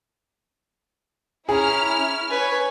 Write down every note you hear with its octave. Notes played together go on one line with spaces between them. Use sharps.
C#4 E4 G#4 A#5 F6
C#4
B4 C#5 G#5